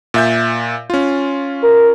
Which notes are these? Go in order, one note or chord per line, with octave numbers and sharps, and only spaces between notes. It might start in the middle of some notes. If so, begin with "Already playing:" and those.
A#2 E5 G6
C#4 F4
A#4